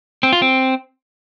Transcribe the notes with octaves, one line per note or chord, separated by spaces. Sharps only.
C4
F4
C4